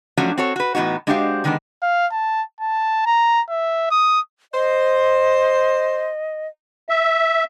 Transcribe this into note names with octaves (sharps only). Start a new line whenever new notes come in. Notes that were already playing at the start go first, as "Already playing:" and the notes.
F3 F#3 A3 C#4 D4 F#4
C4 F#4 A4 C#5
F#4 B4
A2 E3 B3 D#4 F#4
G#3 D4 F#4 G4 C5 F5
D3 D#3 G#3 B3 D4
F5
A5
A5
A#5
E5
D#6
C5 D#5
E5